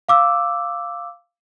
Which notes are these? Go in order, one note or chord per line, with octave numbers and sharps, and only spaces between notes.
F5 D6 E6